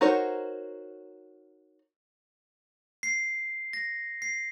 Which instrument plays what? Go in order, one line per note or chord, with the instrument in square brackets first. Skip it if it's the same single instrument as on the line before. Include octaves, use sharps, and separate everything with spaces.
[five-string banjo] D#4 F#4 A#4 C5 C#5
[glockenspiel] C7
A#6
C7